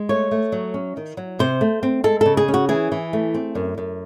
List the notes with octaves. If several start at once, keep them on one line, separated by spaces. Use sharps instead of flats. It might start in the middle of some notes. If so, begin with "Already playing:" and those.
Already playing: G#3
A3 C#5
A3
F#3
C#4
D#3
F#3
C3 C5
A3
C4
G#3 A4
C#3 A4
G#4
C#4
F#4
E3 G#4
E3
A3
C4
F#2
F#2